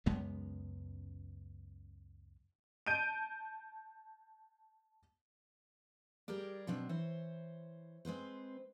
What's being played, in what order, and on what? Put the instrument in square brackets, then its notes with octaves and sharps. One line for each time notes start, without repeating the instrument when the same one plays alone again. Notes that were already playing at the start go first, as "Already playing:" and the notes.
[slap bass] C#2 F#2 G#3 B3
[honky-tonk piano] A5 G6 D7 D#7
[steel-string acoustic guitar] G3 G4 G#4 A#4 D5
B2 F#3 C4 D4
E3 C5 C#5
G#3 C4 B4 C5